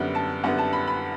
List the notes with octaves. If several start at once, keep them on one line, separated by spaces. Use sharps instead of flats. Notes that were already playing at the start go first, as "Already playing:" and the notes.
Already playing: F#2 D3 G3 B3
A5
F#2 D3 G3 B3 F#5
A5
B5
B5